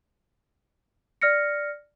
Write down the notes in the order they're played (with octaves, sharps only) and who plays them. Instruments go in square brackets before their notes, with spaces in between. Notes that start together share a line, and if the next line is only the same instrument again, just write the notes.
[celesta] D5 F6 A#6 C#7